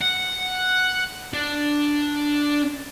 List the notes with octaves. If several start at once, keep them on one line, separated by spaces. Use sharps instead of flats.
F#5
D4